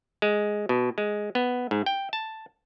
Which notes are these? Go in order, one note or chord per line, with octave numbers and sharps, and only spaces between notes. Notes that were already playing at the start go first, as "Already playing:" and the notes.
G#3
B2
G#3
B3
G#2
G5
A5